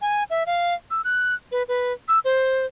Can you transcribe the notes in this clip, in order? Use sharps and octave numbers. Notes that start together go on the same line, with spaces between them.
G#5
E5
F5
E6
F#6
B4
B4
E6
C5